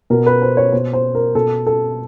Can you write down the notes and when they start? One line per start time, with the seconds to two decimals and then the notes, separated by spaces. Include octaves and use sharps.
0.10 B2 A#4
0.26 B4
0.42 C5
0.57 C#5
0.72 B2 C5
0.93 C5
1.15 A#4
1.35 B2 A4
1.66 A4